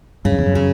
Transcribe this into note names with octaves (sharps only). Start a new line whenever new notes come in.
G2 C#3
F#2
E2
F#2
C#3